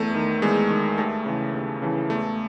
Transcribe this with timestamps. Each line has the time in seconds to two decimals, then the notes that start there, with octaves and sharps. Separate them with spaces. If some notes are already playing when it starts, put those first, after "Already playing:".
Already playing: E2 A3
0.15 D#3
0.42 E2 G#3
0.71 D#3
0.98 D#2 A3
1.26 C#3 E3
1.54 D#2
1.82 C#3 E3
2.10 E2 A3